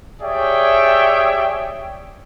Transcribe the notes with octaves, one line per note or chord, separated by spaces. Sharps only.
G4 G#4 C#5 D5 E5 G5